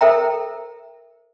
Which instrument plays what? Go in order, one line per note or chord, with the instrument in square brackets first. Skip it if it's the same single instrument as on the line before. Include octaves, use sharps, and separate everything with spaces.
[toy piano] A4 A#4 C5 E5 G5 A#5